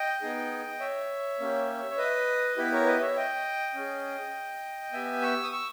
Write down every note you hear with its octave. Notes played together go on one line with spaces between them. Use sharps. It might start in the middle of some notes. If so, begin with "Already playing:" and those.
Already playing: D#5 G5
B3 D#4 G#4
C#5 E5
A#3 C#4 G4
C#5
B4 D#5
B3 E4 G4 B4
A#4 C#5
B4 D#5
C#5 E5
D#5 G5
C#4 G#4
B3 G4 E5 G#5
C#6 E6
D#6
C#6 E6